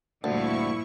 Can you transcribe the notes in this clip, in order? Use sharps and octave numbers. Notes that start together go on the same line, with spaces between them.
D2 G2 A#2 F3 E4 C#6